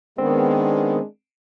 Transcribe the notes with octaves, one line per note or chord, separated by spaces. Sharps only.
D#3 G#3 B3 C4 D4